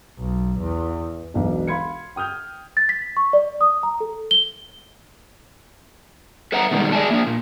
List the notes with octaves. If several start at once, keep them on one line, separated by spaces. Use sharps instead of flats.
B1
E2
E1 B1 F#3 D4
F5 B5 C6 G#6 C#7
G5 D#6 F6 G6
A6
B6
C#6
D5
D#6
A#5
A4
G7
A4 B4 E5 F#5 A#5
B2 D#3 G3 G#3
G#4 D5 E5 G#5 A5
A#3 D4
A#2